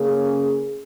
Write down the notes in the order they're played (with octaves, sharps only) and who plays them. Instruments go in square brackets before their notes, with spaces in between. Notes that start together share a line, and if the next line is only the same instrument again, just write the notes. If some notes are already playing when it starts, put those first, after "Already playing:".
Already playing: [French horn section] C#3 A#3 C#4 G#4